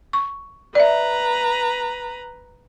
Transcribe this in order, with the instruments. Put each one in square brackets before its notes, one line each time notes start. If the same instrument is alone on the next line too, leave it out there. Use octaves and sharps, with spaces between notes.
[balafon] C#6
[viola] B4 A#5 [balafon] D5 E5